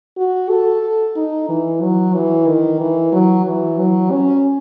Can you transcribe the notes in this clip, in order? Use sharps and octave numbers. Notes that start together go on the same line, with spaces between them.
F#4
A4
D#4
E3
F#3
E3
D#3
E3
F#3
E3
F#3
C#4